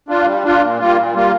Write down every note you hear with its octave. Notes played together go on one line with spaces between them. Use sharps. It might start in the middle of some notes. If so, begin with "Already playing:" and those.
D4 F4
G3
D4 F4
A#2
G3 A#3 F4
A#2
G3 A#3 F4